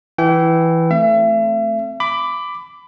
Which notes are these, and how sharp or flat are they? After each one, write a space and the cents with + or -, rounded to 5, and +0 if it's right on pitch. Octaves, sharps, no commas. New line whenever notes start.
E3 +0 G5 -35
A3 +0 C4 +0 E5 +40
B5 +20 D6 +0